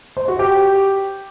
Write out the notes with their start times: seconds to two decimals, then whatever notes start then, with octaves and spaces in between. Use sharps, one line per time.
0.17 C5
0.28 F#4
0.39 G4